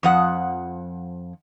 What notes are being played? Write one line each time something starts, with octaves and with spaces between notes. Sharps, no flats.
F2 F3 F#5